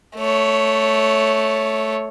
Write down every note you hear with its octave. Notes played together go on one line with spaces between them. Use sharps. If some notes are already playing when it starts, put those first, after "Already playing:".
A3 C#5